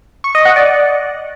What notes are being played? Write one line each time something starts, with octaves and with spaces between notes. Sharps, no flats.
C#6
D#5
F#5
D5